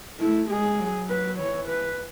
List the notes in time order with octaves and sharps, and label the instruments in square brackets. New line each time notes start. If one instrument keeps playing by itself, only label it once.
[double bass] A3 [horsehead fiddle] E4
[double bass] G#3 [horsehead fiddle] G#4
[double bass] F#3
[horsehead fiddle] B4
[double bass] E3 [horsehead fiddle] C#5
[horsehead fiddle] B4